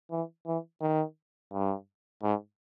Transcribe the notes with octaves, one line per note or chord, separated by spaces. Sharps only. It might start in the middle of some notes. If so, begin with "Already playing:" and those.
E3
E3
D#3
G2
G#2